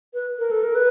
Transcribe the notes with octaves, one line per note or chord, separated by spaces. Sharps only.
B4
A#4
A4
A#4
B4